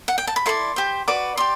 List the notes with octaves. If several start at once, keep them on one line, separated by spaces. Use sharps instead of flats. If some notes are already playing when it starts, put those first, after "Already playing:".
F#5
G5
A5
B5
E4 A4 D5 C6
G4 C5
F#4 B4 D5 D6
G4 D5 C6